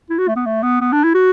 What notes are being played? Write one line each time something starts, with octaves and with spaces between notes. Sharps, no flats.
E4
F#4
A3
B3
A3
B3
B3
D4
E4
F#4